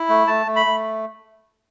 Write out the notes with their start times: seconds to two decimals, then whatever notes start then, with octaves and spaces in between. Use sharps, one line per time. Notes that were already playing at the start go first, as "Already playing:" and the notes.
Already playing: E4
0.09 A3
0.27 A3 A5
0.46 A3
0.56 B5
0.66 A3